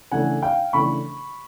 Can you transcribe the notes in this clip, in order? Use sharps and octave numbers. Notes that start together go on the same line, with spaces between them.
C#3 E3 A3 D4 F#5 G#5
F5 G5
C#3 E3 A3 D4 B5 C#6